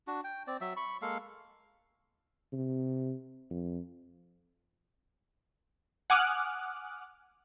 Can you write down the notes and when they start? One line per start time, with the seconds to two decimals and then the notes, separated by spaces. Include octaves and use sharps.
0.07 D4 F#4
0.24 G5
0.47 C4 D5
0.61 F#3 E5
0.77 B5 C#6
1.02 G#3 A#3 A4 F5
2.53 C3
3.50 F2
6.10 F#5 G#5 D6 D#6 F6 F#6